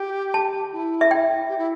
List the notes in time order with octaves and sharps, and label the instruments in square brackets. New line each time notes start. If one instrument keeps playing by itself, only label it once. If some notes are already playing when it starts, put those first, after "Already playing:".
Already playing: [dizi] G4
[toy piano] A5
[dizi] E4
[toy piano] E5
G5
[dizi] G4
E4